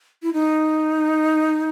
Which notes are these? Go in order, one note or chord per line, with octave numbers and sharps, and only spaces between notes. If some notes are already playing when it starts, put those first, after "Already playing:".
E4
D#4